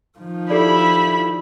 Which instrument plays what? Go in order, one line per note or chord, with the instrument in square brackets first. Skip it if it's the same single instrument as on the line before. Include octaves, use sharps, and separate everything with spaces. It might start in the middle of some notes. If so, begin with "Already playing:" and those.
[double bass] D#3 F3
[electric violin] E4 B5 [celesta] G4 A4 D5